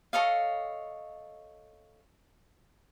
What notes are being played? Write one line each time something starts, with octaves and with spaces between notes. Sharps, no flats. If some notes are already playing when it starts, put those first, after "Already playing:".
A4 C#5 D#5 F5